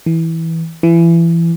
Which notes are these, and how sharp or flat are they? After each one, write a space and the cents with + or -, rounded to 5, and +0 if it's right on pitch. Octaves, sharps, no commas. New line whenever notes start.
E3 -15
E3 +25